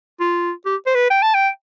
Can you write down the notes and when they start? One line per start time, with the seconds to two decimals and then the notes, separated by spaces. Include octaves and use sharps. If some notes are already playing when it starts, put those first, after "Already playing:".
0.20 F4
0.65 G4
0.86 C5
0.95 B4
1.10 G5
1.22 A5
1.34 G5